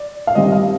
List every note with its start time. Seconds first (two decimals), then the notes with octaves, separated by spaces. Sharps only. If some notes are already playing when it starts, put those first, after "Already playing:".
Already playing: D5
0.27 F5
0.35 G2 D#3 G3 C4 D#5
0.52 F5